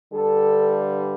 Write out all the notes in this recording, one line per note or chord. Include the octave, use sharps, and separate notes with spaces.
G2 D3 G3 A4